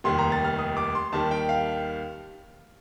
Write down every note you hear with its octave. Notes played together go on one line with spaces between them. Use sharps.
F1 D#2 D#3 G3 C6
A#5
A6
F6
D#6
D6
C6
D#2 D#3 G3 A5
G5
F5